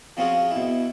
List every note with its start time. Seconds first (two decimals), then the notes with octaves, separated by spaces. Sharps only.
0.17 F3 C4 C#4 F4 F#4 G#4
0.51 B2 E4